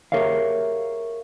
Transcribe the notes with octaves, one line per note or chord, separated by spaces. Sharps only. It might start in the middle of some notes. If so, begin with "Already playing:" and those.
G4 G#4 A#4 C#5 E5 F5